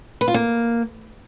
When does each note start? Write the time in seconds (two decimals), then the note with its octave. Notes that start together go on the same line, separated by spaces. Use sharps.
0.21 B4
0.28 F4
0.34 A#3